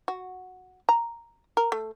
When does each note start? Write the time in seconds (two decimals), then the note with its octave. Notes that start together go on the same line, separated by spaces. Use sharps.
0.08 F#4
0.89 A#5
1.57 A#4
1.72 A3